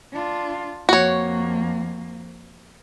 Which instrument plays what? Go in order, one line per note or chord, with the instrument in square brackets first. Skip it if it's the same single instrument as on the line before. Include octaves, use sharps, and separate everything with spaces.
[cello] D4 F4
[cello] F2 A#3 [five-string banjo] F#4 C#5